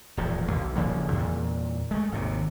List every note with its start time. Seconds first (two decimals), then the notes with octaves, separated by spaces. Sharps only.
0.17 D#1 E2 A2 F3
0.51 B1
0.76 D#1 C#3 F3 A#3
1.13 E2 A#2
1.91 G#3 A3
2.12 G#1 D#2 C3